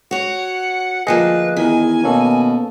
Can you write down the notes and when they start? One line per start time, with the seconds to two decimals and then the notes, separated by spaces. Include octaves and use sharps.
0.11 F#4 C#5 F#5
1.07 D2 F3 A#3 G#4 B4 D#5 G5
1.57 E2 D#3 G#5
2.04 B2 A#3 C#4 A4